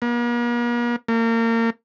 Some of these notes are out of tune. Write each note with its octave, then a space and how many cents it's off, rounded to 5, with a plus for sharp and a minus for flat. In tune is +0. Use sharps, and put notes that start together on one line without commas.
A#3 +45
A#3 -30